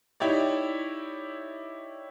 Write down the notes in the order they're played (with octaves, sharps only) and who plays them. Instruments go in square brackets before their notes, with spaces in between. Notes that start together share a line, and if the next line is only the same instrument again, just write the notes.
[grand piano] D#4 E4 G4 C#5 D5